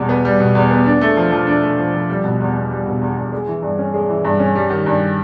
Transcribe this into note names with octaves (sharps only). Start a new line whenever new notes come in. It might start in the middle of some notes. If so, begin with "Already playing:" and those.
Already playing: E2 B2 G3
B3
G3
B2
E2
B3
D4
A3
F3
F3
D4
A3
F3
F3
G3
B2
E2
E2
G3
B2
E2
E2
G#3
E3
G2
C#4
G#3
E3
G2
C#4
G3
D#3
G2